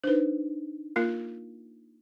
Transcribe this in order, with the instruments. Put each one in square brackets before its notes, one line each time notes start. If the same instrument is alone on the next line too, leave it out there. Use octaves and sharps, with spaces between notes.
[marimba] D4 D#4 [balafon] B4 C5
[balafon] A#3 F4 A#4